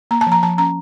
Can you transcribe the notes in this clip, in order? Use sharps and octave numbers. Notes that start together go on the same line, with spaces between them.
A#3 A#5
A5
F3
A#5
F3 A5
C#4 A#5